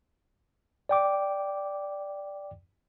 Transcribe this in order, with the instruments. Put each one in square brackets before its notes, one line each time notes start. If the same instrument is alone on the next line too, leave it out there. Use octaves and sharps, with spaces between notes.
[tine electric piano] D5 G5 D6